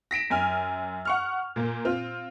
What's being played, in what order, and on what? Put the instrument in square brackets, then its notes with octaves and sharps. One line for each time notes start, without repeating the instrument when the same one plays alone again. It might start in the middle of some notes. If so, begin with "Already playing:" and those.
[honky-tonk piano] A#6 B6 D7 E7
F#2 G#5 F6
F#5 C#6 F6
A#2 A#3
C4 F4